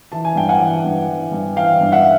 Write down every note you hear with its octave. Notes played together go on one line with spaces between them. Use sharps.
E3 A5
G#5
G2 G5
F#5 G#5
E3
G2
E3
G2
E3 F5 G5
G2
E5 F#5